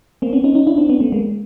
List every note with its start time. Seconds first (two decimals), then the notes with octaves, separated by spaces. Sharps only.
0.22 A#3 C4
0.33 B3 C#4
0.44 C#4 D#4
0.55 C#4 D#4
0.67 D4 E4
0.78 C4 D4
0.89 B3 C#4
1.00 A3 B3
1.12 G#3 A#3